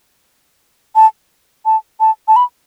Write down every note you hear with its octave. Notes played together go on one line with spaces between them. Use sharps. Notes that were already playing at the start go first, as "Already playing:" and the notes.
A5
A5
A5
A5
B5